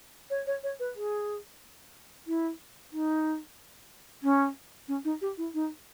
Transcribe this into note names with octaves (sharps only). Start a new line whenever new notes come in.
C#5
C#5
C#5
B4
G#4
E4
D#4
C#4
C#4
D#4
G4
E4
D#4